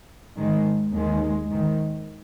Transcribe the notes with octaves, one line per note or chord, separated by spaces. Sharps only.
G#2 D#3 G#3
D#2 D#3 G#3
G#2 D#3